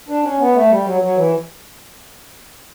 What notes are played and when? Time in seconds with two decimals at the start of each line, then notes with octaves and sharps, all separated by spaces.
0.09 D4
0.23 C#4
0.39 B3
0.54 A3
0.70 G3
0.85 F#3
1.01 F#3
1.16 E3